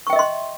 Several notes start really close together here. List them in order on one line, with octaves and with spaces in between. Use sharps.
C#6 G5 E5 D#5 C6